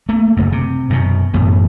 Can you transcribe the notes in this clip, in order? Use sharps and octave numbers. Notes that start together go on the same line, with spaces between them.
A3 A#3
F#1 F#2
C3
F#2 B2
F#2 A2 E3 B3